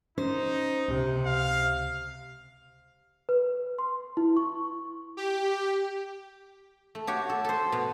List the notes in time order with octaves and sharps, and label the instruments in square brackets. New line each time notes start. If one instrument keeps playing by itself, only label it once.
[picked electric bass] C#4 [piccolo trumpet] D#4 [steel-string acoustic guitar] C5
[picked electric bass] C#2 [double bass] C3
[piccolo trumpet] F5
[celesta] B4
C6
E4
C#6
[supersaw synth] G4
[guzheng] A3
F#4 G4 C#5
A4
A4 C5
B2